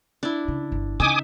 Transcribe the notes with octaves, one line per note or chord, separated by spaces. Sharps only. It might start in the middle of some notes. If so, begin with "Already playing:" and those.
D4 E4
C#3
G1
C#3 D#4 E5 G#5 D6 D#6